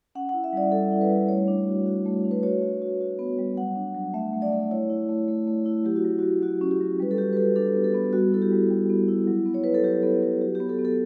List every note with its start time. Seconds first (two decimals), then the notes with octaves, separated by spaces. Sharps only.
0.15 C#4 F#5
0.29 F#5
0.34 E4
0.44 E5
0.53 G3 D5
0.72 G3 A4
0.92 E4
1.01 B4
1.10 G3
1.29 A3 C#5
1.48 D4
1.67 F#4
1.86 F#4
2.06 A3
2.24 D4
2.31 B4
2.43 F#4 C#5
2.62 F#4
2.82 F#4
3.01 F#4
3.19 B3
3.39 G3
3.57 F#3 F#5
3.76 D4
3.95 F#3
4.14 A3 E5
4.33 A3
4.42 D5
4.52 A3
4.71 E4 C#5
4.90 E4
5.09 A3
5.28 A3
5.47 A3
5.66 E4
5.85 F#3 G4
5.96 F#4
6.05 F#3
6.18 F#4
6.23 F#3
6.43 F#3 F#4
6.61 C#4
6.71 G4
6.81 F#3
7.00 G3 B4
7.11 A4
7.18 F#4 G4
7.33 B4
7.37 F#4 A4
7.56 D4 A4
7.75 B3
7.84 A4
7.94 B3
8.13 G3 F#4
8.32 E4 A4
8.42 G4
8.52 G3
8.70 G3
8.90 B3
9.08 E4
9.27 F#3
9.46 B3
9.54 C#5
9.64 B3 B4
9.74 A4
9.84 F#3 G4
10.03 B3 A4
10.23 F#3 G4
10.41 F#4 G4
10.55 G4
10.60 B3
10.69 A4
10.79 B3
10.85 A4